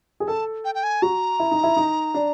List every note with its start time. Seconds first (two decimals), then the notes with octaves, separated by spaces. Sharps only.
0.20 G#4
0.27 A4 A5
0.65 G5
0.75 G5
0.83 G#5
1.02 F#4 A#5
1.40 E4
1.51 D#4
1.64 E4
1.77 D#4
2.14 D4